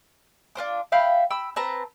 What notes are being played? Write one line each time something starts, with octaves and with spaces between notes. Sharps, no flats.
D4 F4 C5 D6
E5 F5 G5 B5
G5 B5 E6
C4 B4 A5 A#5